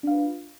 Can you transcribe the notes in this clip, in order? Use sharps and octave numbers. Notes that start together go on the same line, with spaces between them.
D4 F4 B4 F5